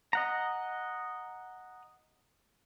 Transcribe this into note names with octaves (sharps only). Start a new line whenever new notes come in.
D#5 F#5 A#5